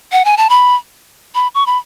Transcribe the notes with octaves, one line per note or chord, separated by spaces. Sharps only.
F#5
G#5
A5
B5
B5
C#6
B5